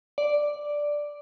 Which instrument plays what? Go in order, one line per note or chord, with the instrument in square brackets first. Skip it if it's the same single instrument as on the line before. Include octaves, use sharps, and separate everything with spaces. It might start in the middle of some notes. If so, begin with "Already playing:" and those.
[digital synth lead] D5